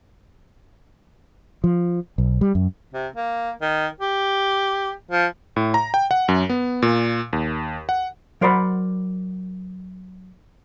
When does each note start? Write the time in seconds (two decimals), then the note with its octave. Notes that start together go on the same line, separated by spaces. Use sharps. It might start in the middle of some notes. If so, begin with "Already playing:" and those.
1.64 F3
2.18 B1
2.41 G3
2.55 F#2
2.94 C3
3.16 A#3
3.62 D#3
4.01 G4
5.11 F3
5.56 A2
5.74 A#5
5.94 G5
6.11 F#5
6.28 F#2
6.49 B3
6.82 A#2
7.33 D#2
7.89 F#5
8.41 F#3 A#4 C5 D5 F#5 B5